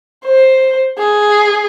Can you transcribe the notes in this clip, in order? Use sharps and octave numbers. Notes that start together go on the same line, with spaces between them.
C5
G#4